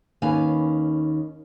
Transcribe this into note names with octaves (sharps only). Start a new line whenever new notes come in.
D#2 D#3 C#4 B4 F5 G#5